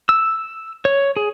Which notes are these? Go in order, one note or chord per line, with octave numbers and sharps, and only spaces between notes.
E6
C#5
G#4